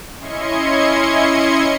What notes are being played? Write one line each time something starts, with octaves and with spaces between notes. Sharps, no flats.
C#4 E4 D#5 C6 G#6 C#7